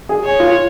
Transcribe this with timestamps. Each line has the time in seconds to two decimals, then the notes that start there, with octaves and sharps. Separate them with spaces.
0.09 G#4
0.24 C#5
0.40 F4